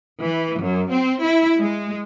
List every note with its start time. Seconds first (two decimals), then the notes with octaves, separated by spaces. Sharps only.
0.21 E3
0.59 F#2
0.91 C4
1.22 E4
1.59 G#3